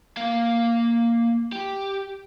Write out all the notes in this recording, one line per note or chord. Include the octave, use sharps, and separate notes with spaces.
A#3 F5
G4